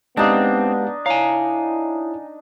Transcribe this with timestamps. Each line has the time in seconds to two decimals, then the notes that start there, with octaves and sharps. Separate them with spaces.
0.17 G#3 B3 C4 D4 D#4 G4 F5
1.06 E4 C#5 F5 G#5 A#5